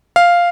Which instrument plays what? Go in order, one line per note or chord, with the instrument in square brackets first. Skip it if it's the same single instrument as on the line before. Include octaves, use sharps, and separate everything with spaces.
[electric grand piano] F5